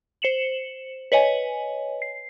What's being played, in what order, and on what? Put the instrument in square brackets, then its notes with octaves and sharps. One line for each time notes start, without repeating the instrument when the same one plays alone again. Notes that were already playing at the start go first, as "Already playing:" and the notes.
[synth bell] C5 C#7 E7 F#7
B4 C#5 D#5 G#5
C7